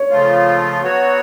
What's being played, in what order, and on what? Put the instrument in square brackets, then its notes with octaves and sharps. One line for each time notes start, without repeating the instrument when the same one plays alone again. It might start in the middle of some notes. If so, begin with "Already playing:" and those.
Already playing: [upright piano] C#5
[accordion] C#3 F3 A3 F4
F#3 B3 F#4 C#5